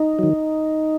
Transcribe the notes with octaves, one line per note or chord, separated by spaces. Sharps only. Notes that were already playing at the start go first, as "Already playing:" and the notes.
Already playing: D#4
D#3 F#3